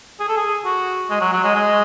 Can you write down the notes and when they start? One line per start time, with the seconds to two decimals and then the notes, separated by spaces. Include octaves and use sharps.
0.20 G#4
0.29 A4
0.37 G#4
0.65 F#4
1.10 G#3
1.21 F#3
1.33 F#3
1.44 G#3
1.55 G#3